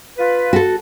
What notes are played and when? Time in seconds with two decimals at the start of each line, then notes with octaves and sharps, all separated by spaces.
0.18 F4 B4
0.53 F#4 A4